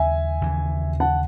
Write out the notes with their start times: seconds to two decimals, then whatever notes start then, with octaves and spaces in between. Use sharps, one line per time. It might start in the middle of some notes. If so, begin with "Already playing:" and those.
Already playing: D#2 C#3 F#3 E5 G#5
0.41 D#2 C#3 E3
1.00 F#5 A5